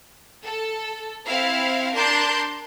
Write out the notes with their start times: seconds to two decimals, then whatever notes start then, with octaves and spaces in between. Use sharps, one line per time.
0.45 A4
1.28 C4 E4 F5
1.95 D4 A#4 A5 C6 D6 G6